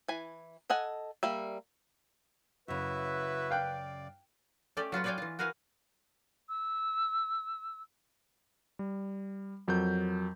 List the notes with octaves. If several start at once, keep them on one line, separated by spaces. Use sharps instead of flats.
E3 G#5
A4 D#5 F#5 G#5
G3 A#3 E5
F#2 C#3 E4 F#4 B4 E5
D5 F5 G5 F#6
A3 C#4 G4 D5
F#3 F4 F#4 B4
B4 C#5 D5 F5 G5 G#5
E3 F4
F#4 A#4 B4 F5 G#5
E6
G3
F2 F#3 A#4 G6